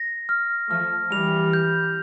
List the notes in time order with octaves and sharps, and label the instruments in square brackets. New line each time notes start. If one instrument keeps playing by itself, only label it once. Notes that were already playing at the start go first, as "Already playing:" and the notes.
Already playing: [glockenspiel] A#6
F6
[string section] F3 A3 [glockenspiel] F6
[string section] E3 G3 [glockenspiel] F7
[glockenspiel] G6